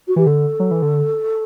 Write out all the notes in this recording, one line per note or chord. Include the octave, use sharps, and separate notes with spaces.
F#4
E3 G4
D3 A4
F#3
E3
D3